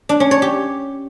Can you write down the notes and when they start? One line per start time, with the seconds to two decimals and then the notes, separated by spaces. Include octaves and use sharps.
0.09 D4
0.20 C#4
0.31 C#5
0.42 G4